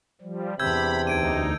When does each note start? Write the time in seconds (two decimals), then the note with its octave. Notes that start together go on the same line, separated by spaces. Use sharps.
0.21 F3 G3
0.59 E2 C3 D4 B5 E6 G6 G#6
1.07 D2 D#4 G#6 D7 D#7